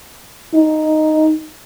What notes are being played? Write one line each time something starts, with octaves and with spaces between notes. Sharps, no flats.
D#4